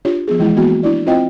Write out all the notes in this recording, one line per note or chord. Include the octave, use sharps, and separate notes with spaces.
D4 F4 G4 C#5
F3 B3 G#4
E3 G#3 E4
E3 A#3 B3 F#4
D4 E4 D5
C4 E4 F4 C5 D#5 G5